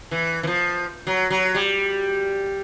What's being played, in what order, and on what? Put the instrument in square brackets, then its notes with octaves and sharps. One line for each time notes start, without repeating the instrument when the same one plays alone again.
[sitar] E3
E3
F3
F#3
F#3
G3